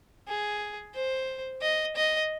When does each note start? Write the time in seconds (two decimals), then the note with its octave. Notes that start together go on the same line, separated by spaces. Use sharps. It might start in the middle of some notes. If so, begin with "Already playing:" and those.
0.28 G#4
0.94 C5
1.62 D#5
1.96 D#5